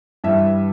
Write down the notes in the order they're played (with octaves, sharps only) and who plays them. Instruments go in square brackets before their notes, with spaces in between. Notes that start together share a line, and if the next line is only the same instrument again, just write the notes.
[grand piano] G2 E3 G3 E5